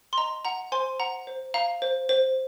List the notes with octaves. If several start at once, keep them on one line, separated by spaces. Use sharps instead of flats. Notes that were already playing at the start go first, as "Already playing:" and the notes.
C6
D#5 A#5
F#5 A#5
C5 G#5 C6
F#5 A#5
C5
F5 A#5
C5
C5